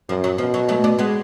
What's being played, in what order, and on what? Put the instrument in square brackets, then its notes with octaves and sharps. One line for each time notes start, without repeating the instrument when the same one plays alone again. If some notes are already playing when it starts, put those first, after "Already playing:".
[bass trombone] F#2 [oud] F3
[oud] F#3
[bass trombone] B2 [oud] F3
[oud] F#3
F#3 A3
B3 D4
G#3 B3